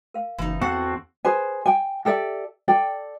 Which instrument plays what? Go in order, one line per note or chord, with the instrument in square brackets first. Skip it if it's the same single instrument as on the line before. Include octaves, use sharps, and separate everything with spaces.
[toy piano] A#4 F5
[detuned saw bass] F#1 [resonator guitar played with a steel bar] E3 D#4
[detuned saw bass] E2 [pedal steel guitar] C4 F#4 A4 [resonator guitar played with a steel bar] F#5
[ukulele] G#4 B4 C5 G#5
G5 G#5
G4 A4 D5 E5
A4 D5 G5